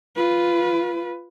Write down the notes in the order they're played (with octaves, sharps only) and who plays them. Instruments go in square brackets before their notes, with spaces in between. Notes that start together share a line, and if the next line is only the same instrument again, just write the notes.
[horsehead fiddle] F4 B4